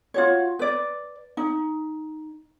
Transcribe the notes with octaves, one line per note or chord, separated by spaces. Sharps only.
F4 F#4 C#5
B4 D5
D#4